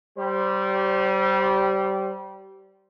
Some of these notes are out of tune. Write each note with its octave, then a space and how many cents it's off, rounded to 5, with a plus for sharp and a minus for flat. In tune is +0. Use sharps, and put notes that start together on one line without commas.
G3 -20 C5 +0